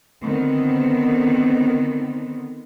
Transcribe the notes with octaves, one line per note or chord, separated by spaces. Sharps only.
D3 D#3 B3 C4